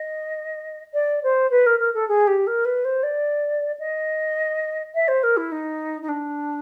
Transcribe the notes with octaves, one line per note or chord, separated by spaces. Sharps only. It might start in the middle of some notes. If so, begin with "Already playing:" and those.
Already playing: D#5
D5
C5
B4
A#4
A#4
A4
G#4
G4
A#4
B4
C5
D5
D#5
E5
C5
A#4
E4
D#4
D#4
D4